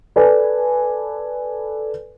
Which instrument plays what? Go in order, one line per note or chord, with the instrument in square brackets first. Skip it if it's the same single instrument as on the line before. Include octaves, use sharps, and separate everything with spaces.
[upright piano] A4 B4 D5 G#5